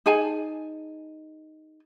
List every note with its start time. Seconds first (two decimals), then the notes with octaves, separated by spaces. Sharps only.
0.06 D#4 G#4 G#5 A5